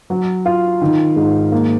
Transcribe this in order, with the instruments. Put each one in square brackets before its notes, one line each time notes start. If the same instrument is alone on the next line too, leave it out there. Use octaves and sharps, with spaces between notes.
[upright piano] F#3
F4
D#3
G#2
A#3